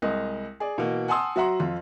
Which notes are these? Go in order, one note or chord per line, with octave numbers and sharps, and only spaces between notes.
C2 G#3 D#5
G#4 D5
B2 E3 A#3
F#5 G#5 A5 C6 D#6 E6
F#3 F#4 E5 F#5 A#5 C6
F2 F4